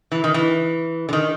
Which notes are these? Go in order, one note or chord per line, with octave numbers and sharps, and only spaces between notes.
E3
D#3
E3
D3
D#3